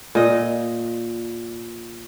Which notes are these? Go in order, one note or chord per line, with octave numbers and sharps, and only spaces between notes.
A#2 D#5